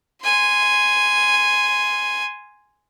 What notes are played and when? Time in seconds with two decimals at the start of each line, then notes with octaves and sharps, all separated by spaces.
0.23 G#5 C6